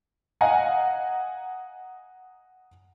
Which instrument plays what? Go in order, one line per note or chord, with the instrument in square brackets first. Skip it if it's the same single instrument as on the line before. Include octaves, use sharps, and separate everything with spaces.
[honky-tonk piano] D#5 F5 F#5 G#5 A#5